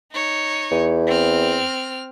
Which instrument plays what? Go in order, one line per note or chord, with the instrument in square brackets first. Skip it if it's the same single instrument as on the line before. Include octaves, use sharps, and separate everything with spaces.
[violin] D#4 C#5
[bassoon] E2
[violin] C4 F6